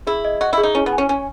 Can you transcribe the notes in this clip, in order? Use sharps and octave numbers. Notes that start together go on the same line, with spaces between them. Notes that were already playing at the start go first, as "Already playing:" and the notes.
E4 G#4
D#5
F#4 D#5
E4 G#4
D#4
C#4 E4
B3
G#5
C#4
C#4 G#5